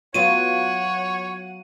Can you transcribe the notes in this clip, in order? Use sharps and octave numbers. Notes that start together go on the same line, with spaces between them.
F#3 B3 F4 C#5 F#5 D#7